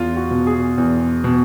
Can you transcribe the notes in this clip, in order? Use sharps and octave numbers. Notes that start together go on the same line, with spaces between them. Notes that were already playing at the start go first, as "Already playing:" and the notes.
Already playing: E2 F4
F#4
B2
G#4
E2
B2